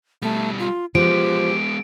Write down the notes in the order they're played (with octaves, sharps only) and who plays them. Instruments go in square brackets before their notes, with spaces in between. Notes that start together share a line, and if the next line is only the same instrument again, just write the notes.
[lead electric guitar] B2 G3 [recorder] A3
[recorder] F4
[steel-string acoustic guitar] F3 [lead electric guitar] G#3 B3 [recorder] G4 [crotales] D7